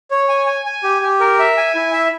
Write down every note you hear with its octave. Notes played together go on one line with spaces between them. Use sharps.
C#5
G#5
G#5
G#5
G4
G4
A#4
E5
G#5
E4
E5